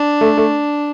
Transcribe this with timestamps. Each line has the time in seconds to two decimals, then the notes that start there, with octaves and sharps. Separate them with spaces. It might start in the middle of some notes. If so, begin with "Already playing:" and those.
Already playing: D4
0.21 A3
0.37 A3